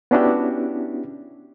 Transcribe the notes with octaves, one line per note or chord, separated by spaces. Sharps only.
B3 C#4 D4 E4 F#4 G4